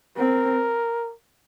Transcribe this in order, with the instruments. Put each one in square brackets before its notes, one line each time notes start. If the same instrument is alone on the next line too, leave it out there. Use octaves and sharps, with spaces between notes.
[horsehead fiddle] C4 [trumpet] A#4